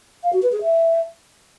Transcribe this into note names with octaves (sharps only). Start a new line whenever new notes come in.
F5
F#4
B4
G#4
E5